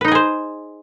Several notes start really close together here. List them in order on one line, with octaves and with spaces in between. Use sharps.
B4 D#4 D#5 G#4 C5